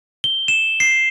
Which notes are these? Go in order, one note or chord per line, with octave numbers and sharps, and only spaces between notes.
G7
E7
C7